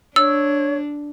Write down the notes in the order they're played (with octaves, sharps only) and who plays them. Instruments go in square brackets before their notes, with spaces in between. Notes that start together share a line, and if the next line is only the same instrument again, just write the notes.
[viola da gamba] D4 [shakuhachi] C#5 [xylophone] E6